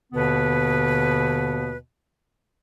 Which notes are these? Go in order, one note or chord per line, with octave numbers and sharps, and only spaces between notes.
D#2 B2 D3 B3 B4